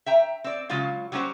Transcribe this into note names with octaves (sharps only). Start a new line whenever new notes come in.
E5 G5 A#5
C4 D5
C#3 F#3 G#3 F4 F5
F#3 G3 A#3 C#4 F#4 C5